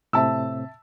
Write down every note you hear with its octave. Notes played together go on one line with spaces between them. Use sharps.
A2 C3 C4 E5 A5 E6